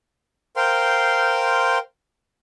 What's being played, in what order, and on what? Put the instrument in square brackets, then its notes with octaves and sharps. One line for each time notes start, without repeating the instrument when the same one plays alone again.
[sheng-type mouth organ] A#4 C5 F5 G5 C6